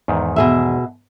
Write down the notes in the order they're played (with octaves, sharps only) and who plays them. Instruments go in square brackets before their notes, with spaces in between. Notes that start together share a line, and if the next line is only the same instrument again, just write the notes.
[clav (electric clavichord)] E2 G#2 D#3
[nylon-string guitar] B2 G#4 E5